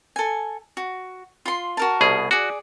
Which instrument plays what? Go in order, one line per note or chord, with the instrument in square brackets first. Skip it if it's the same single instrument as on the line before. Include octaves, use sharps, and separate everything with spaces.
[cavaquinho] A4 G#5
F#4
F4 C6
F#4 A#4 A5
[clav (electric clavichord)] C2 B2 G#4
[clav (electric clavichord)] F#4 [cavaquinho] G#4 D5